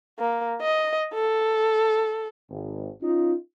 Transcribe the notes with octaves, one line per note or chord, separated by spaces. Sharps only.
A#3
D#5
A4
G#1
C#4 D#4 F4